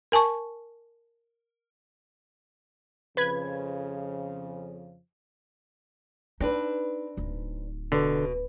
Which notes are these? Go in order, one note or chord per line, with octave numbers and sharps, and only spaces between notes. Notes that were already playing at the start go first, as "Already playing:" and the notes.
A#4 G#5 A5 C#6
F2 C#3 F3 B4 B5 G#6
C4 D4 D#4 B4
D1 D#4
B2 D3